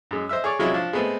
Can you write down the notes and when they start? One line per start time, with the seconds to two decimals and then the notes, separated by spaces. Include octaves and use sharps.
0.11 F#2 G#3
0.29 C5 D#5 E5 E6
0.44 G#4 C#5 D5
0.59 C3 F#3 G#3 C#4 E4 F4
0.74 F3 D4
0.93 G#3 A3 B3 C4